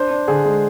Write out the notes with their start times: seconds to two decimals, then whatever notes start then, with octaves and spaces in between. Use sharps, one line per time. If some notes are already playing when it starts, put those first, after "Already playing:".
Already playing: D4 C5
0.11 D4
0.28 D3 G#4
0.45 G#3